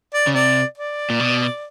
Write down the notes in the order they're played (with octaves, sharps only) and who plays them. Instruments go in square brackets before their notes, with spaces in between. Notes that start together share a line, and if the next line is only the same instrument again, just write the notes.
[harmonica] D5
[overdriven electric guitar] C#3
[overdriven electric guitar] C3 [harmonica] D5
[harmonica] D5
[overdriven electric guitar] A#2
B2